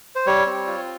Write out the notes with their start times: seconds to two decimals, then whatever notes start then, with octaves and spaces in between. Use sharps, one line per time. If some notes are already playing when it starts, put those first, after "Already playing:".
0.15 C5
0.26 G3 C#5
0.46 C4
0.67 F4